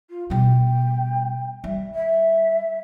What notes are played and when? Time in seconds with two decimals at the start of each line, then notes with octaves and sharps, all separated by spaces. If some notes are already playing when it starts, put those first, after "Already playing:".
0.10 F4
0.30 B2 G3 G5
1.64 G3 E5
1.95 E5